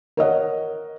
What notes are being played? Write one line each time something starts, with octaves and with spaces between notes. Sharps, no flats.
A#4 C#5 D#5 F#5